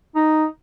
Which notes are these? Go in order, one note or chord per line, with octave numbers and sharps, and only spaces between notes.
D#4